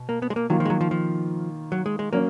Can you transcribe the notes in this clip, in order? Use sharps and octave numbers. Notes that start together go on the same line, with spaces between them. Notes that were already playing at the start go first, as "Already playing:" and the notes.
Already playing: B2
A#3
B3
G#3
A#3
D#3 F#3 A#3 F4
F3
G#3
F#3
F3
F3
F#3
G#3
G#3
F#3 A#3 C#4